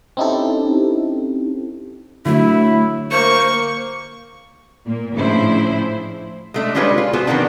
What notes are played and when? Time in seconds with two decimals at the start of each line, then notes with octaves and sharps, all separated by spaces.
0.17 C4 C#4 D#4 E4 G4 A4
2.26 D3 F#3 A3 E4
3.11 A#3 C5 C#6
4.85 A#2 A#3
5.14 A2 C#3 F3 D4 E4 C5
6.54 G#3 A3 D4
6.75 G3 G#3 D4 F4 B4 C#5
6.98 F4
7.13 B3 F#4 G#4 C5
7.27 D#3 F3 B3 C4 D4